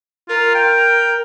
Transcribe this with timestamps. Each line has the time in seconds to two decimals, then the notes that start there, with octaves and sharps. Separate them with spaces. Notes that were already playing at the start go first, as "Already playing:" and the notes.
0.29 F4 A#4
0.55 G5